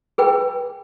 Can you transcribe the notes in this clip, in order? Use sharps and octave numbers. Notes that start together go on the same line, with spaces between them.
G#4 B4 G5 G#5